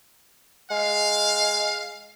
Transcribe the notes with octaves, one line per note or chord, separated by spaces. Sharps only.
G#3 F5